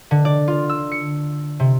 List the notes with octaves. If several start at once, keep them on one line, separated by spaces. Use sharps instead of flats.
D3
D5
F4
E6
C#7
C3